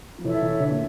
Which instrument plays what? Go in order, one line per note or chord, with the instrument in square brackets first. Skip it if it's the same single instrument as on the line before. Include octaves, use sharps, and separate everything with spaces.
[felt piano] F3
[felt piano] E3 [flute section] A4 C#5 E5
[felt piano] E3
D3
A#2